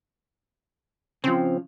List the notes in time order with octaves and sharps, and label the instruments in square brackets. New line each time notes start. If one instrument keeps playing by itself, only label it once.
[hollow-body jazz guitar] C#3 F3 [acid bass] C4